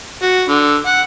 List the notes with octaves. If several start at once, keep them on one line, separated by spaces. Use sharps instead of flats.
F#4
D3
F#5